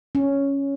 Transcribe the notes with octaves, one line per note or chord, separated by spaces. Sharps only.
C#4